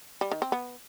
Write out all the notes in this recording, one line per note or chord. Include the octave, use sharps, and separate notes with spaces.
G3
D#3
C4
B3